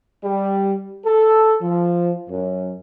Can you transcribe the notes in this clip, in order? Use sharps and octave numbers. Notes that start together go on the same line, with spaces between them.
G3
A4
F3
F#2